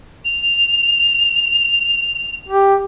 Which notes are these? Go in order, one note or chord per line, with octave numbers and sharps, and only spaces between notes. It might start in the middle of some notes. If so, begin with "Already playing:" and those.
F7
G4